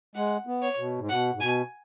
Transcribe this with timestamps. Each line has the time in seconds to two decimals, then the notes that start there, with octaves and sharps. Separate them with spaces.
0.15 G#3 F#5
0.47 B3
0.62 C#5
0.78 B2
0.98 G#2
1.09 B2 F#5
1.34 G#2
1.40 B2 G#5